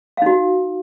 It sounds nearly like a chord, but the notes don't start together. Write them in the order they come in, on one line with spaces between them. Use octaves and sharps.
F5 D#4 F#4